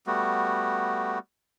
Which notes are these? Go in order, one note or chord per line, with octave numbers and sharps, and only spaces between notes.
G3 A3 B3 F#4